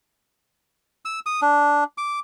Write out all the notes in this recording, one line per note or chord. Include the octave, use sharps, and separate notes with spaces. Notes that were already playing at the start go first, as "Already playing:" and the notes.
E6
D#6
D4
D6